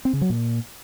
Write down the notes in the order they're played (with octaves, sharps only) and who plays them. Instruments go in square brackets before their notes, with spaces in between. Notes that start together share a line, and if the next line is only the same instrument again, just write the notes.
[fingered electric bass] C4
C#3
F#3
A#2